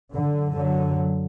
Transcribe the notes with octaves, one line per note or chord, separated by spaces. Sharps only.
F#2 D3
D3 F#3